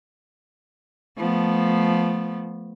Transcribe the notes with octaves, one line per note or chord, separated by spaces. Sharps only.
F3 A3 B3